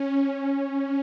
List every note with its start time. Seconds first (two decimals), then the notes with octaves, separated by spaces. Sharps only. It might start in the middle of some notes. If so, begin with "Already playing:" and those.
Already playing: C#4
0.51 C#4